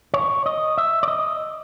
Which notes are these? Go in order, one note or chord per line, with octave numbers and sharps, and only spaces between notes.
C#5
D#5
E5
D5
D#5